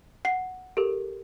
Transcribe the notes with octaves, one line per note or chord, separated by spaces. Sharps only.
F#5 C7
G4 A4 A#4